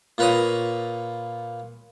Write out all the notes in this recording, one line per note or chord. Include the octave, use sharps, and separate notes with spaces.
A#2 F4 B4 C#5 A#5 D#6